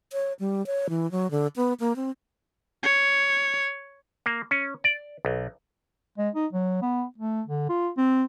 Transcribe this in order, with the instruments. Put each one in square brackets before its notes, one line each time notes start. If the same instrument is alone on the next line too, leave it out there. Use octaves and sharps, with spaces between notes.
[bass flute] C#5
G3
C#5
E3
F#3
D3
B3
A#3
C4
[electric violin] C#5
[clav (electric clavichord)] A#3
C#4
D5
B1
[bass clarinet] G#3
D#4
F#3
B3
A3
D3
F4
C4